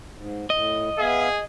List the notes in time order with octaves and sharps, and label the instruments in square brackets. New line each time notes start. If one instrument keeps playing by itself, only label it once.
[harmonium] G#2
[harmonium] A2 [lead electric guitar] D#5
[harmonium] B3 E5 F5 [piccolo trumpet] G#4